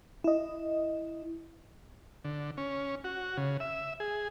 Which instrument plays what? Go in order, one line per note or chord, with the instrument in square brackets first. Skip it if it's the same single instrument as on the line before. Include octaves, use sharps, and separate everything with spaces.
[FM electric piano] E4 D#5
[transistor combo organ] D3
C#4
F#4
C#3
E5
G#4